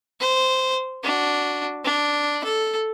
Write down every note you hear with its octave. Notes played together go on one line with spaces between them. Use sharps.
C5
D4 F#4
D4
A4